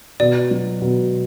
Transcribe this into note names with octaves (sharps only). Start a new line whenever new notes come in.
B2 D5
F#3
B2